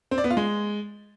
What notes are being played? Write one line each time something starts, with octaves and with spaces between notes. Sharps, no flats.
C4
D5
B3
F4
G#3